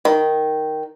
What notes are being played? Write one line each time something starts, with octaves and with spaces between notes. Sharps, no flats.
D#3